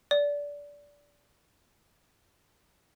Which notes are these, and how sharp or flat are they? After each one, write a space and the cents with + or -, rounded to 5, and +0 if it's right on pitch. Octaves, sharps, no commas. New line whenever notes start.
D5 -20